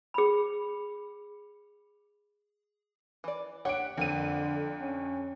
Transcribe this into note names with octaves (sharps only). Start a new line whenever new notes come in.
G#4 B5
E3 D5
D4 G4 C#5 F#5 D7
F2 D3 A#3 C4 D#7
C#4